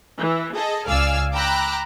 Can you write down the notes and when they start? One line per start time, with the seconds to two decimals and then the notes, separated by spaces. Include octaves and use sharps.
0.18 E3
0.55 G#4 A4 D#5
0.87 C#2 D5 F5 G#5 E6 F6
1.33 G5 A#5 B5 D6 E6 F#6